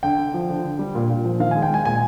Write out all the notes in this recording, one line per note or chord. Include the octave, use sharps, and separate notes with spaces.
D3 G5
D3
F3
D3
D3
G3
A#2
A#2
F3
D#3 F5
G#3 G#5
G5
G#3 G#5
A#2 G#5